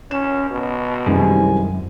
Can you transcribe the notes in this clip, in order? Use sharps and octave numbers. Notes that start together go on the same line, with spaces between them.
C#4 E7
B2
C2 F#2 D#3 G#3 C#4 G#5